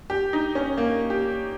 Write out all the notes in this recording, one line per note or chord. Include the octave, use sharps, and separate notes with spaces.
G4
D#4
C#4
A#3
G4